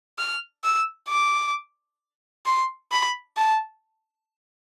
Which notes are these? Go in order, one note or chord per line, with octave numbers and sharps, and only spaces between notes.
F6
E6
D6
C6
B5
A5